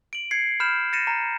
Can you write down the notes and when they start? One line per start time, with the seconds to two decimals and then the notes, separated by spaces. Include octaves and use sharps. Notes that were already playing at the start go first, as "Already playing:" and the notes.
0.13 D7 F#7
0.31 G#6 C7 C#7
0.60 B5 F6 G6 E7
0.93 A6 A#6 C#7 D#7 E7
1.07 A#5